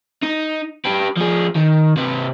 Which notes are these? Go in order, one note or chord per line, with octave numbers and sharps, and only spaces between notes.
D#4
G4 B4
F3 G#4
D#3
C3 B4